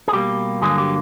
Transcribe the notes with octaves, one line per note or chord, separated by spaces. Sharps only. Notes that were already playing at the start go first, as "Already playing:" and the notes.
G#4
B2 G3 A#3 G4
G2 D3 F#3 A#3 G#4
G4